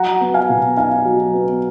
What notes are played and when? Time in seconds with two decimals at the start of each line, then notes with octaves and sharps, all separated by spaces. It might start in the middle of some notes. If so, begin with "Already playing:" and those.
Already playing: F#3 F#5 A#5
0.21 B3
0.34 F5 G#5
0.49 B2
0.77 D#4 F5 G#5
1.05 F#3
1.34 B3